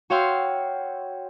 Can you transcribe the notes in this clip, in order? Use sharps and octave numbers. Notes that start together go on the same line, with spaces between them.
F#4 C#5 F5 G5 C6 E6